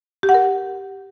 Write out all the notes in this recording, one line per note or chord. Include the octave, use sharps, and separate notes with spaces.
G4
F#5
A#4